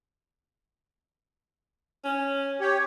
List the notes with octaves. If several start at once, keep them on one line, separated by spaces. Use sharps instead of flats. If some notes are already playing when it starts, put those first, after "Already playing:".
C#4
G4 C#5